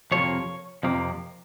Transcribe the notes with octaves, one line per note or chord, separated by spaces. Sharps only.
F2 C3 F3 A#3 C#5
F2 C3 F3 A#3